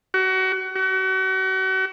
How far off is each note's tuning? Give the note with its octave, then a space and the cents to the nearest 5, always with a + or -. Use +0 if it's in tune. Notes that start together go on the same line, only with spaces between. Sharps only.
F#4 +30
F#4 +40